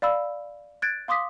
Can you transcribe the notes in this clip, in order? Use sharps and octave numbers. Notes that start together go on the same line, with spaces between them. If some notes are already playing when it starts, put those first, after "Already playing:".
D5 F5 B5 E6
F#6 G#6 A6 D7
F5 C6 D6 D#6 B6